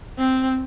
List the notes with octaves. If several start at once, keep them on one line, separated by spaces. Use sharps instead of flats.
C4